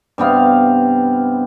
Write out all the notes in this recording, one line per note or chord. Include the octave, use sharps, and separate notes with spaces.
G2 C3 B3 F5